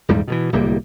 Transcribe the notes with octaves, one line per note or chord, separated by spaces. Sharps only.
D#1 E2 G#2 G3
B2 D3 E3
D1 C2 G3 A#3